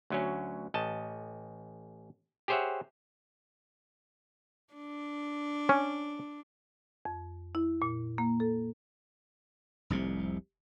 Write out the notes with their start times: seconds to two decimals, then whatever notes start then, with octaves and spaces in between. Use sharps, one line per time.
0.10 D2 F#3 C#4
0.74 A1 D#5 A5
2.48 G4 G#4 C5 C#5 E5 F#5
4.74 D4
5.69 C#4
7.05 F2
7.55 E4
7.82 A#2
8.18 A#3
8.40 A4
9.90 F1 C2 C3